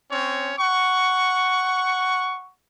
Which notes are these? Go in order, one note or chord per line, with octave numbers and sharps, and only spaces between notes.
C4 C#4 C#5
F#5 C#6